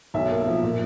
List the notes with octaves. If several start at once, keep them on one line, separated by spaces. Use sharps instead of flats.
B1 E5
A#3
F3
A#2